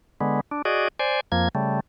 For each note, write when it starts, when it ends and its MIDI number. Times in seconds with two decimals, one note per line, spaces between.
0.21 0.40 50
0.21 0.40 56
0.21 0.40 59
0.51 0.62 62
0.65 0.88 66
0.65 0.88 68
0.65 0.88 74
0.65 0.88 75
0.99 1.20 72
0.99 1.20 74
0.99 1.20 80
1.32 1.48 41
1.32 1.48 53
1.32 1.48 58
1.32 1.48 92
1.55 1.80 49
1.55 1.80 55
1.55 1.80 57